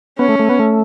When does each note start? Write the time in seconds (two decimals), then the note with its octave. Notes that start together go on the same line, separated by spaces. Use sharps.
0.19 B3 C#4
0.29 A3
0.39 A3
0.50 B3
0.59 A3